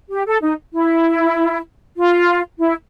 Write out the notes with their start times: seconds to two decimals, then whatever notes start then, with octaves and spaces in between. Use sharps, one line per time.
0.11 G4
0.27 A4
0.42 D#4
0.72 E4
1.97 F4
2.59 E4